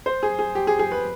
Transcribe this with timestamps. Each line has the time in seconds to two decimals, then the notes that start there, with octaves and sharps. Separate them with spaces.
0.06 C5
0.23 G#4
0.39 G#4
0.55 G4
0.67 G#4
0.79 G#4
0.92 B4